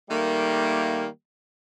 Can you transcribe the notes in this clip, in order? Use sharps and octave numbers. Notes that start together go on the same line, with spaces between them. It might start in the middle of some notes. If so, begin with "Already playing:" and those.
D#3 G3 A3 A#3